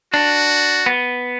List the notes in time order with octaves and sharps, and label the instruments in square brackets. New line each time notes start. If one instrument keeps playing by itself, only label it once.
[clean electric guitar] D4 [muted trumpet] F#4
[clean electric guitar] B3